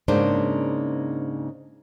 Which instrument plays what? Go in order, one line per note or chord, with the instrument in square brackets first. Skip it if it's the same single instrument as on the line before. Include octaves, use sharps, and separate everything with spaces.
[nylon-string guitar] G#2 C#3 A#3 D4 C5